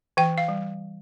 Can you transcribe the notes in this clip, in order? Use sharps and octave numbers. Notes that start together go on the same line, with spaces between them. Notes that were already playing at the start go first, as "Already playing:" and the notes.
E3 G5
F5
G3